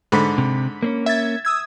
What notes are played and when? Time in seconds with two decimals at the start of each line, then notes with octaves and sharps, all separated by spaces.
0.12 G#2 D3 B5 B6
0.38 C3
0.83 A#3 C4 C#4
1.06 E5 G#6 A6
1.45 D#6 E6 G#6